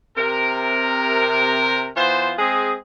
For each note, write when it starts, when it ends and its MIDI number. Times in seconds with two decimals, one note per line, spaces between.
0.17 1.88 48
0.17 1.88 70
1.97 2.32 52
1.97 2.32 59
1.97 2.32 65
1.97 2.32 72
2.38 2.74 56
2.38 2.74 60
2.38 2.74 68